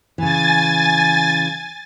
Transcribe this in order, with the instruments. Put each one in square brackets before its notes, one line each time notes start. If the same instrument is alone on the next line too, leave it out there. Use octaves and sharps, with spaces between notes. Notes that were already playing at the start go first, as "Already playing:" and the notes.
[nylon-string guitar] C#3 E3 [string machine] G#5 A6